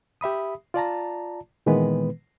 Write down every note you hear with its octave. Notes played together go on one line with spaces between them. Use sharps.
G4 E5 B5 D#6
F4 D5 A5 A#5
A#2 D#3 E3 G#3 B3 B4